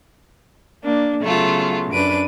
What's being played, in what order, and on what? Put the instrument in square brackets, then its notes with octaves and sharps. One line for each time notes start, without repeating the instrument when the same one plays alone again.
[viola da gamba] A#3 D4
[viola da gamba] C#3 F#3 B3 [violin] A3 F4
[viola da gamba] F#2 D4 B4 [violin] D7 D#7